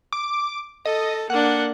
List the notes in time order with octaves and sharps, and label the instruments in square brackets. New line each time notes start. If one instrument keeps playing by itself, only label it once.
[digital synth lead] D6
[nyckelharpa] A4 [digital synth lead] D#5
[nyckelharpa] A#3 D4 [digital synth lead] F#5